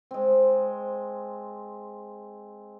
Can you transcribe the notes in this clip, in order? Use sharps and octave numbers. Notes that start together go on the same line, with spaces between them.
G#3 C4